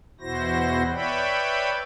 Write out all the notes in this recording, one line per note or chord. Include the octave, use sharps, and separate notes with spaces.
E2 B2 E4 F#4 C5 A#6
B4 C#5 D5 E5 G5 B5